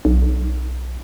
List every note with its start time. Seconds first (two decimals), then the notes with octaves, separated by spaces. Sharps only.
0.05 B1